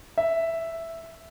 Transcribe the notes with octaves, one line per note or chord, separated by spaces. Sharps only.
E5